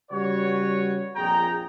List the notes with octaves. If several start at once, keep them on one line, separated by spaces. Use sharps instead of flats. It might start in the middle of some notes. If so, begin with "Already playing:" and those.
C#3 G3 F#4 B4 C#5
A#1 F2 G#4 G5 A#5